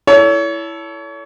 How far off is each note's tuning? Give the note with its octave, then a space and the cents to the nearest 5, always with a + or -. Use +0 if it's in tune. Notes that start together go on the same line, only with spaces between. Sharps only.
E4 +0 A4 +0 C#5 +35